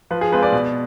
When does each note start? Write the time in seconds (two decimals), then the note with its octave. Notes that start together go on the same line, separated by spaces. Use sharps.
0.11 F3 B4
0.21 G#4
0.32 G#3 C4 F4 B4
0.43 B4 D5
0.52 B2